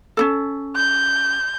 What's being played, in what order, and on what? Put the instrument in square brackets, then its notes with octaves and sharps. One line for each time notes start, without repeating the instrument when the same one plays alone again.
[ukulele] C#4 D4 A4
[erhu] G6